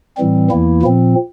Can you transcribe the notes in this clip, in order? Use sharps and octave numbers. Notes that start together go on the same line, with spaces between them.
A2 E3 G3 C4
E2 E3 A#3 E4
A#2 F3 C4